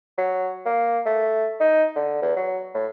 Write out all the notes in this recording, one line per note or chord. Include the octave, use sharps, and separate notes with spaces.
F#3
A#3
A3
D#4
D3
E2
F#3
A2